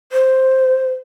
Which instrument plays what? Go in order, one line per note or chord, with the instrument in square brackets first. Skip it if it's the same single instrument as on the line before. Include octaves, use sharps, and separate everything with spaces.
[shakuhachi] C5